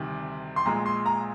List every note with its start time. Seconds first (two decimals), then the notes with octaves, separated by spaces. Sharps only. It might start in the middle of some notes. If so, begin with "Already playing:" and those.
Already playing: D2 C3 D#3 G3
0.56 C6
0.65 A#1 A#2 G#3 A#5
0.86 C6
1.06 A#5